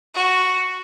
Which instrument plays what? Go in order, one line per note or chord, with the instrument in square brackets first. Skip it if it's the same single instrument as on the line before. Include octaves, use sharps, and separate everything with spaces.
[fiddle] F#4